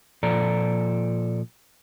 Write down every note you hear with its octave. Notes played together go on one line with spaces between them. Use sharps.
A#2 F3 A4 D5 A#5